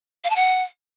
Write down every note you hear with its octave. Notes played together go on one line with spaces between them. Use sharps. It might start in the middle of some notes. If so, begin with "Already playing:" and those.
F5
A5
F#5